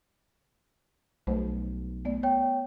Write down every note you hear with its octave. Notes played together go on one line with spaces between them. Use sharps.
B1 G3 A3 C5
A3 B3 D5
B3 C#5 G5